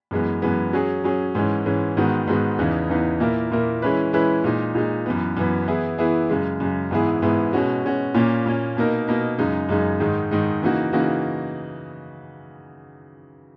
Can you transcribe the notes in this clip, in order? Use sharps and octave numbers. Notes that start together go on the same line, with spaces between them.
F#2 E3 G#3 B3
F#2 E3 G#3 B3
F#3 C#4 G#4
F#3 C#4 G#4
G#2 E3 G#3 C#4
G#2 E3 G#3 C#4
G#2 D#3 G#3 B3 F#4
G#2 D#3 G#3 B3 F#4
E2 C#3 E3 B3 D#4
E2 C#3 E3 B3 D#4
A#2 A#3 E4 A#4
A#2 A#3 E4 A#4
E3 G#3 C#4 E4 B4
E3 G#3 C#4 E4 B4
A#2 G#3 D#4
A#2 G#3 D#4
F#2 E3 B3
F#2 E3 B3
E3 B3 E4 G#4
E3 B3 E4 G#4
F#2 C#3 G#3
F#2 C#3 G#3
G#2 E3 B3 E4 G#4
G#2 E3 B3 E4 G#4
B2 G#3 C#4 F#4
B2 G#3 C#4 F#4
A#2 A#3 C#4
A#2 A#3 C#4
B2 A#3 D#4 A#4
B2 A#3 D#4 A#4
F#2 C#3 G#3 D#4
F#2 C#3 G#3 D#4
G#2 D#3 G#3 D#4
G#2 D#3 G#3 D#4
C#3 E3 A#3 D#4 F#4
C#3 E3 A#3 D#4 F#4